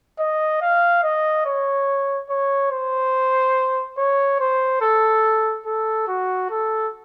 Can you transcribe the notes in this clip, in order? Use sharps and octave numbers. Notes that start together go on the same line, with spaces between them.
D#5
F5
D#5
C#5
C#5
C5
C#5
C5
A4
A4
F#4
A4